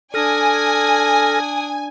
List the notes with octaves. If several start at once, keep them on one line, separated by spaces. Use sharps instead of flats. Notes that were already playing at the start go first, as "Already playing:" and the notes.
D4 A4 G#5 D#6 F6 A#6